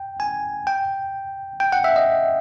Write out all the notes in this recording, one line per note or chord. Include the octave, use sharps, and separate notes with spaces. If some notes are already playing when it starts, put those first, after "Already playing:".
Already playing: G5
G#5
G5
G5
F#5
E5
D#5